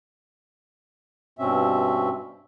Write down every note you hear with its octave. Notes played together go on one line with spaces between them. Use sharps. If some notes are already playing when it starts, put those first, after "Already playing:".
G2 B2 C4 C#4 E5